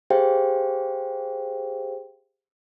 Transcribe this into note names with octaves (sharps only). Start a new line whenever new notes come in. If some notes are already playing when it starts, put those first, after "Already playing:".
G4 G#4 C5 F5 G5